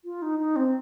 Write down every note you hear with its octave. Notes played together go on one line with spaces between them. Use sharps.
F4
D#4
D#4
C4